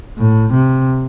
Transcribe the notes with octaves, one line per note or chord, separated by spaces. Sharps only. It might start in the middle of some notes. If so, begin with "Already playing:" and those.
A2
C3